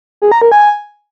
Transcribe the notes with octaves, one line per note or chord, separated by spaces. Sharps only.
G#4
A#5
A#4
G#5